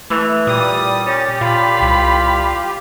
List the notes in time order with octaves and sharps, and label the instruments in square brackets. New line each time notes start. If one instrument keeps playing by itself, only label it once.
[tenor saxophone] E3 [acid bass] A3
[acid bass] A#2 [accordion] G3 D#6
[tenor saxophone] C#4 [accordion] G4 [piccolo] A6
[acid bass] A#2 [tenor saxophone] F4 [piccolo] B5
[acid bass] C2